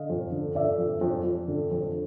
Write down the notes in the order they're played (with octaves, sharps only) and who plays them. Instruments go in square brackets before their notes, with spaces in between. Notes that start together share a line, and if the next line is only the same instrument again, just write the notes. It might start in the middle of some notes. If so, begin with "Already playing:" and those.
Already playing: [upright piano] D3 D#5 F5
F2
D3
D3 D5 E5
F2
F2
F2
D3
F2